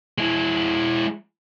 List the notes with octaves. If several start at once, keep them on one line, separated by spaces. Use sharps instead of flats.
G#3 E4